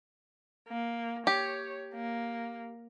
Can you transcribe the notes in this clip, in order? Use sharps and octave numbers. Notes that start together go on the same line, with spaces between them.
A#3
G4 C#5
A#3